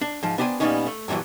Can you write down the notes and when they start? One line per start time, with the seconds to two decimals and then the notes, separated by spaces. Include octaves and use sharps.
0.02 D4
0.23 G#2 F3
0.38 B3 D4 G4 C5 G#5
0.60 A#2 G3 A#3 B3 C#4 D#4
0.87 A3
1.08 G2 A#2 C#3 E3 F#3